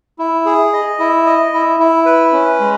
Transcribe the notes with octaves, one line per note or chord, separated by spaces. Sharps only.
E4
G#4
D#5
E4
D#5
E4
E4
B4
C#4
G#3